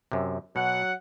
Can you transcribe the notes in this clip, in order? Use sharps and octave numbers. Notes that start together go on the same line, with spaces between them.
F#2 C3
B2 F#3 F#5